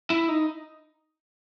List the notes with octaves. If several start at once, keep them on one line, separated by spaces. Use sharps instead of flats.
E4
D#4